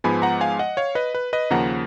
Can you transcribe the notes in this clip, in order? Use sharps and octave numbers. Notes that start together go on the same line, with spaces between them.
G#2 F3 G#3 B3 G#5 B5
F#5 A#5
F5 G#5
D#5 F#5
C#5 F5
B4 D#5
B4
B4 D#5
D#2 C#3 F3 A#3 F#5 A#5